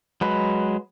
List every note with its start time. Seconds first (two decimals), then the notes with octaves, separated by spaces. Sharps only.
0.21 F#3 G#3 B4